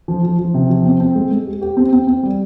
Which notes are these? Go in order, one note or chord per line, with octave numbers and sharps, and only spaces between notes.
F3
F3
F3
C3
F3
C4
C4
G#3
G#3
G4
G4
C4
C4
C4
G3